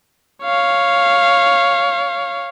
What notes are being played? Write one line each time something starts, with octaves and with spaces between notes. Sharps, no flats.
C#5 F5